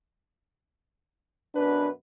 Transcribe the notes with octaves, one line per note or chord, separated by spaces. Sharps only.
F#2 B2 D4 B4